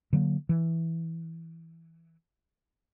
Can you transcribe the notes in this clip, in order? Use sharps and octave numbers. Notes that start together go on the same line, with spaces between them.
D3 F#3 G#3 A#3
E3